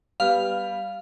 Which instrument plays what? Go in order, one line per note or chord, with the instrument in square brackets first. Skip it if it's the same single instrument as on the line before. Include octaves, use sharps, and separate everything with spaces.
[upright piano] G3 B3 F6 [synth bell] F5